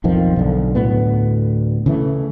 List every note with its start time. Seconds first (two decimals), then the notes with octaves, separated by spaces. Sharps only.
0.04 B1 F2 D#3 F3
0.36 B1 D3
0.75 D2 A2 B3
1.86 C#3 E3 A3